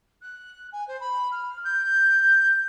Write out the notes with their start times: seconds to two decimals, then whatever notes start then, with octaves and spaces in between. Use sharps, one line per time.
0.21 F#6
0.72 G#5
0.87 C5
1.00 B5
1.31 F6
1.64 G6